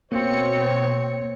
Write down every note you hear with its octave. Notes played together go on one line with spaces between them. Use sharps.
B2 A#3 C4 C#5 C#7